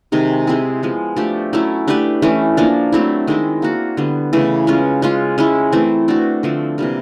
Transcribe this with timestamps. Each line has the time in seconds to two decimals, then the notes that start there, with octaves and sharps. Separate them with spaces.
0.12 C3 D#3 G#3
0.47 G#3 C4 E4 G#4
0.83 F3 G#3 B3
1.16 F3 A3 D4 G4
1.53 F#3 A3 C#4 E4
1.88 A3 D4 G4 B4
2.22 E3 A3 C#4
2.57 F3 A#3 D4
2.92 F#3 A3 C4 E4
3.27 D#3 G#3 C4 E4
3.62 A#3 D4 F#4
3.97 D3 G3 B3
4.33 C#3 E3 A3
4.67 G#3 C#4 F4
5.02 G#3 C#4 F4
5.38 G#3 C#4 E4
5.72 E3 A3 C4
6.08 A3 D4 F#4
6.43 D3 F3 A3 C4
6.78 C3 E3 G3 A#3